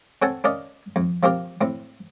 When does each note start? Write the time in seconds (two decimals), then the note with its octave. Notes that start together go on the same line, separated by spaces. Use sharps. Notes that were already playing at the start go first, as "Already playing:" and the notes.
0.22 C4 A4 C#5 F#5 G#5 A5
0.44 C#4 A#4 D5 D#5 F5
0.96 F2
1.23 F3 A#3 C4 G4 A#4
1.61 A2 C4